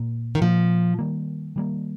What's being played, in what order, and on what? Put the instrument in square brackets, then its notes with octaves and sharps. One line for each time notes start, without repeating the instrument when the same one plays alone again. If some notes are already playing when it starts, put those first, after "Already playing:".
Already playing: [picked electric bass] A#2 A#3
[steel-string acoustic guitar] D#3
[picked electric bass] A#2 A#3 [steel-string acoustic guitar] F3
[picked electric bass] D#3 G3 A#3
D#3 G3 A#3